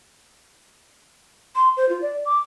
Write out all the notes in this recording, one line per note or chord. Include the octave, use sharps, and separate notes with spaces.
C6
C5
F4
D5
D6